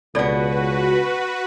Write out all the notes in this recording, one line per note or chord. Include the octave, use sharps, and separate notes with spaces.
C#2 B2 B3 F#4 A4 B4 D5 F#5